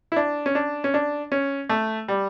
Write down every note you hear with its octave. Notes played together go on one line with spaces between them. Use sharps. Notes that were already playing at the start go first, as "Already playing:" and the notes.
E4
D4
C#4
D4
C#4
D4
C#4
A3
G3